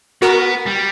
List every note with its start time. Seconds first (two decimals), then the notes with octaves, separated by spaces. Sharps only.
0.22 B3 F#4 A#4
0.66 G3